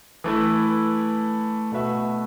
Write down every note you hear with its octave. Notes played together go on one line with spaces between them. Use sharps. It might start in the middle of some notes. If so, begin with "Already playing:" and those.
E3 A3 E4 B4
B2 A3 F#4 B4 E5